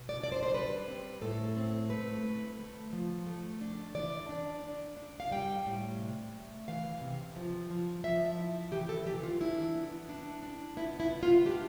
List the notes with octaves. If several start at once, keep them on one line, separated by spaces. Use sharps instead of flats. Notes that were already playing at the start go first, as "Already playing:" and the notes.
Already playing: B2
D5
D4 D5
C5
C5
G3 B4
C4
A2 A4
C4
A3 B4
D3
A3
F3
A3
D4
E3 D5
D4
D4
D4
F5
G3 G5
A2
C3
A3
E3 F5
C3
F3
F3
F3 E5
E4
E3 G4
A4
E3 G4
F4
D4 E4
B3
D4
D4
B3 E4
E4
B3
F4
D4 G4